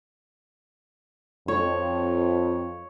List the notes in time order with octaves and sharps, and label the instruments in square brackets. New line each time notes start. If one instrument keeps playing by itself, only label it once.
[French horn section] F2 [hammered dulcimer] C#5